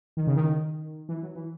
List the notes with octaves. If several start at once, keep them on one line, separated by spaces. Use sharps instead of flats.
D#3
C#3
D#3
E3
F#3
E3